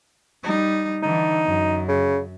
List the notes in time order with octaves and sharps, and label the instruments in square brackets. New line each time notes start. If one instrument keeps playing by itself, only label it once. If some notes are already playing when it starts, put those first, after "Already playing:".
[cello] G3 D#4
[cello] D3 E3 [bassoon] D#4
[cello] F#2
[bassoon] C#3